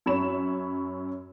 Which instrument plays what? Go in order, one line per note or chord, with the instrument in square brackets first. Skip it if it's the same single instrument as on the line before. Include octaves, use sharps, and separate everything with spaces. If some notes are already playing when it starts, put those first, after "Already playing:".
[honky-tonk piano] F#2 C#5 B5 E7